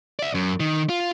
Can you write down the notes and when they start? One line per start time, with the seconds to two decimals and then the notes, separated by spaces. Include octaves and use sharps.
0.19 D5 E5
0.35 F#2
0.60 D#3
0.89 F4